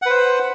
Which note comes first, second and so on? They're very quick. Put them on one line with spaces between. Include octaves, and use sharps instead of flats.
F#5 B4 C5